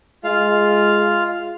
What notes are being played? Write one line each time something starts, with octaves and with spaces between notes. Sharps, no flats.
G#3 F4 F5